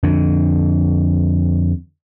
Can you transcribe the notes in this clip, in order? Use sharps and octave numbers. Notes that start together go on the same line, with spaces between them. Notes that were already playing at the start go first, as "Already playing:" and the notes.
F2 D3